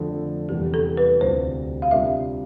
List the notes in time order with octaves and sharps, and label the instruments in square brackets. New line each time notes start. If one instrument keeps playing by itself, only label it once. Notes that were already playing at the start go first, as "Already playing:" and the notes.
Already playing: [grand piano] F2 D3 A3 [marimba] F4
[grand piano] E2 C3 E3 G3 [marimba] G4
[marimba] A4
B4
[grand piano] D2 C3 G3 C4 F4 [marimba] C5
[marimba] F5
[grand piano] C3 G3 D4 F4 [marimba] E5